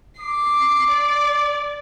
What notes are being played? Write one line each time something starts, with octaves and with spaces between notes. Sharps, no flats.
D6 C7
D5